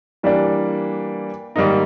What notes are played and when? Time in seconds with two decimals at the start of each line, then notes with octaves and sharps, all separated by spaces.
0.23 E3 G3 A#3 D4
1.56 G#2 D#3 G3 A#3 D#4